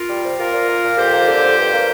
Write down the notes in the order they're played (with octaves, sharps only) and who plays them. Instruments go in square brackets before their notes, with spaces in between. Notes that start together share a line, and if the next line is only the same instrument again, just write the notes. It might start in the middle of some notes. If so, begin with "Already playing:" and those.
Already playing: [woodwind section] F4 A#4
G3
C3
A#3 F4 A#4
A#2
A#3
A#2
F2 G4 C5
A#3
D3
F2
G2
A#3